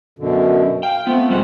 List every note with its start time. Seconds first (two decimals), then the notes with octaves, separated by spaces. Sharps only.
0.19 F#2 B2 D3
0.83 F5 G5
1.07 A3 B3 C4 F4
1.30 E2 B2 G3 G#3 F#5